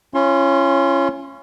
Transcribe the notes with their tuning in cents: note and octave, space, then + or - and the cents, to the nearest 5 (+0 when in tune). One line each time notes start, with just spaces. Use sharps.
C#4 -10 F4 -45 C6 +30